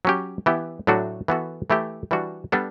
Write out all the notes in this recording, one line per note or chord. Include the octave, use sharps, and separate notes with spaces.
F#3 C#4 G4
E3 B3 E4 G4
A2 F#3 A3 D4 F#4
E3 B3 F#4 A4
E3 A3 E4 G4
E3 G3 D4 F#4
G3 B3 D4 A4